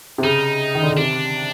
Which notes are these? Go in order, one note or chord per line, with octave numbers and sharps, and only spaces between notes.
C3
C#3 D#4
D#3
D3
C#3
C3 D4